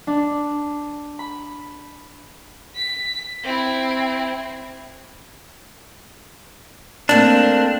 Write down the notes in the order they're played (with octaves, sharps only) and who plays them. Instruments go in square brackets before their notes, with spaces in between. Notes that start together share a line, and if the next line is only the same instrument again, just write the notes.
[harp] D4
B5
[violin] B6
C4 E4
[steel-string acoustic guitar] A3 A#3 C4 [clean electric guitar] D4